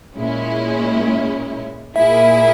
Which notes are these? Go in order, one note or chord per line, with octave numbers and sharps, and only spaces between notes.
A#2 G#3 C#4 E4
A#2 A#3 E4 G#4 E5